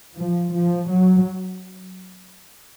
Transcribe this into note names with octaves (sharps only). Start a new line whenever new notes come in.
F3
F3
F#3